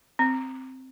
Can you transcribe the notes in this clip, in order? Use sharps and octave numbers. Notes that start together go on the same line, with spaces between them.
C4